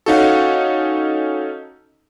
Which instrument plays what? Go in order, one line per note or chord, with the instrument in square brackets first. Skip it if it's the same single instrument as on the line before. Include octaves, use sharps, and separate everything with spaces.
[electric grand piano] C#4 D#4 A4 [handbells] F#4 F5 F#5